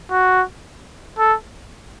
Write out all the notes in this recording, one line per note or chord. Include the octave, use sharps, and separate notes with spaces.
F#4
A4